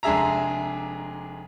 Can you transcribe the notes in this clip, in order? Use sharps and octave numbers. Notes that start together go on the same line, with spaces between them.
F1 G#3 D4 G#4 E5 A#5